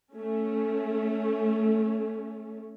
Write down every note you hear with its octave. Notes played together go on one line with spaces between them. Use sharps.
A3 C#4